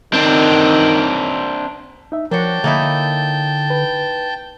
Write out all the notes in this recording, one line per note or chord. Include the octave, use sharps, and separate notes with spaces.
D#3 C4 D4
D#4 E5
F3 D4 F#4 A#4 C#5 G5 A5
D3 A#3 D#4 E4
B4